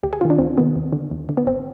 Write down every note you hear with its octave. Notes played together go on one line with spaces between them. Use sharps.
D2 G4
G#4
C3 D#3 F4
D4
D2 C4
C3 D#3 B3
D#2
D3
D#2
D3
B3
G#1 C4